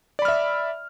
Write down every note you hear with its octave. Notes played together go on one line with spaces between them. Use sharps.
D5 E5 B5 F6